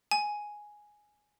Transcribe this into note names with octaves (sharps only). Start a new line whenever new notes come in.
G#5